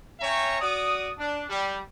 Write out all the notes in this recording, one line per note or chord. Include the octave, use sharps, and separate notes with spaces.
C#4 C#5 E5 G5 A#5
F#4 D5 D#6
D4
G3